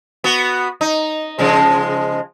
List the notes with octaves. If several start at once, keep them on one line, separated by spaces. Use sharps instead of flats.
B3 F#4
D#4
C#3 F3 G#3